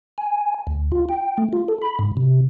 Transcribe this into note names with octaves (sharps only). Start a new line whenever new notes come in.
G#5
D2
F4
G5
A3
F4
A4
B5
G#2
C3